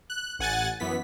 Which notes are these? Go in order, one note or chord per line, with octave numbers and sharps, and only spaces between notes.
F#6
A1 F#5 G#5 F#6 A6
F#2 E3 B3 B6